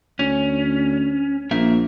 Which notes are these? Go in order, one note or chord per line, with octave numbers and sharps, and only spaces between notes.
D2 C#4
A#1 A#3 E5